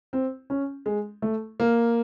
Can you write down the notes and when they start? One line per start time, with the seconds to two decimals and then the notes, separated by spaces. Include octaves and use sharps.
0.13 C4
0.50 C#4
0.86 G#3
1.22 A3
1.60 A#3